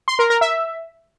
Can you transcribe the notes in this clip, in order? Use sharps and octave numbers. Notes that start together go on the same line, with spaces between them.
C6
A#4
A#4
E5